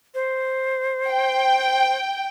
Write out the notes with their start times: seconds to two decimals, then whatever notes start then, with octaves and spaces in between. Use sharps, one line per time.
0.14 C5
1.10 G5